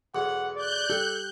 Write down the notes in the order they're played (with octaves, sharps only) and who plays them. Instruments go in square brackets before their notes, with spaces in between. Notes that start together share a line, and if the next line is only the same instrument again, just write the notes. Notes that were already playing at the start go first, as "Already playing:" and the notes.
[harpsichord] B1 E2 [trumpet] F#5
[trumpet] D5 [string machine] F#6 G6
[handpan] G4 [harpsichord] A4